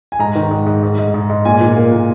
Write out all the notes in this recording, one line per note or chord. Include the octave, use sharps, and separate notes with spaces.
G#5
G#2 A#5
D#3
G#2
G#2
G#2
G#2
G#2
G#2
A#2 G#5
A#2
A#3
A#2